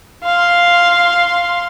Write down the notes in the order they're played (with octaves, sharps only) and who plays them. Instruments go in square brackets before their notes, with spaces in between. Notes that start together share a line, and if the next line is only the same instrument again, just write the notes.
[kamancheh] F5 C6